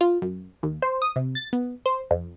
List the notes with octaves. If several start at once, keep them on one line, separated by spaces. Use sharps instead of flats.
F4
F#2
D#2
C5
D#6
C3
A6
B3
C5
F2